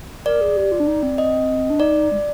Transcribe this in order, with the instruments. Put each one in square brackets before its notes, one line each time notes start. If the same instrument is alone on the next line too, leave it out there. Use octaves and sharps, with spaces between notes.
[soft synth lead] A#4 [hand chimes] D5
[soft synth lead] G#4
G4
F4
D4
D#4
C4
[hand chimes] D#5
[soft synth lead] D4
[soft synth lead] D#4 [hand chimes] D5
[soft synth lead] G#3